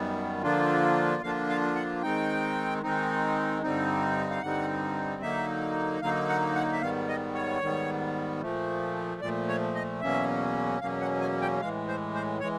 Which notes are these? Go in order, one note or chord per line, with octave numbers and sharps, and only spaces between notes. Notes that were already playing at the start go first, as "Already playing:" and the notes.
Already playing: F#2 D#3 G3 B3
D3 F3 A#3 D4 F4
D3 F3 A#3 D4 F4 F5
F5
F#5
D#3 G#3 C4 D#4 G5
D#3 G#3 C4 D#4
G2 D3 G3 C4 D#4
F5
G2 D3 G3 C4 D#4 F#5
D3 F#3 A#3 D#4 E5
D3 F#3 A#3 D#4 F5
F#5
F#5
E5
G#2 D#3 G3 B3 F5
D#5
C#5
G#2 D#3 G3 B3
A#2 F3 A3
A#2 F3 A3 D5
C#5
D#5
E2 B2 F#3 A#3 C#4 E5
E2 B2 F#3 A#3 C#4 F5
F#5
G#5
G5
A2 E3 G#3 F5
C5
C5
E3 G#3 C#5